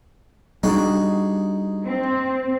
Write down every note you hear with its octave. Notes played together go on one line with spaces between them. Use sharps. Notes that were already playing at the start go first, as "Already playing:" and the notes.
G3 B3 D4 D#4 F#4 G#4
C4